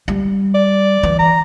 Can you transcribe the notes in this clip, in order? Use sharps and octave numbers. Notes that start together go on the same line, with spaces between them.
G3
D5
E3
A#5